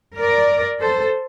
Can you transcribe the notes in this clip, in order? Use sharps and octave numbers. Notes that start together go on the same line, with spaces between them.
A#4 D5
A4 C5